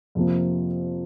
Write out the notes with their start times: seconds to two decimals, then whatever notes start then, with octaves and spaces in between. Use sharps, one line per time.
0.15 F2 C3 F3 A#3